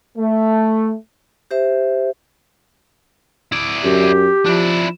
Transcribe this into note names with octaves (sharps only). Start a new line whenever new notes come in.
A3
G4 C5 E5
E4 D5
F#2 G4
F3 D4 E4